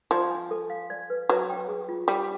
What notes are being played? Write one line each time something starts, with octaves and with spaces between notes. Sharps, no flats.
F3 D5
G#5
A4
F5
D5
B4
F#3 B4
G5
G#4
F4
G3 F4